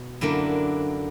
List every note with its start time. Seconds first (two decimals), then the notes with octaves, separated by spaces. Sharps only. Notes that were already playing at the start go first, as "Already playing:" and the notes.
Already playing: B2
0.21 F#2 D3 A#3 D4 E4